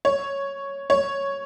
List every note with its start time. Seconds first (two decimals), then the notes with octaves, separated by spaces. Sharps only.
0.05 C#5
0.90 C#5